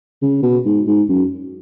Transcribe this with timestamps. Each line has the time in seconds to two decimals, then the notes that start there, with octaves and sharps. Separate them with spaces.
0.22 C#3
0.43 B2
0.66 G#2
0.87 G#2
1.09 F#2